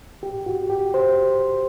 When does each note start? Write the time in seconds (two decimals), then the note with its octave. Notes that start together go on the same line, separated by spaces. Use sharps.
0.23 G4
0.46 F#4
0.70 G4
0.94 C5